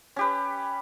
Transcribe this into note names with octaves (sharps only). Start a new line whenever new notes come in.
C#4 G4 B4